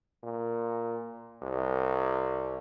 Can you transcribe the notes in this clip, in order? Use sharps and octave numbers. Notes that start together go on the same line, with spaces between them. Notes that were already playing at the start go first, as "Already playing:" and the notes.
A#2
C2